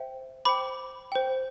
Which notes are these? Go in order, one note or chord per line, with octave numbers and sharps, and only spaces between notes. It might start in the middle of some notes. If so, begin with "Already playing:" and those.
Already playing: C5 E5 G5
C5 G5 B5 D6
C5 G5